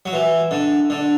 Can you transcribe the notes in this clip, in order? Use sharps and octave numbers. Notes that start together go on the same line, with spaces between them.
F#3
E3
D3
D3